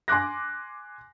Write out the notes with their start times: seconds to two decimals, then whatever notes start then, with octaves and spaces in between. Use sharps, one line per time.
0.08 G#5 C6 D6 F#6 A#6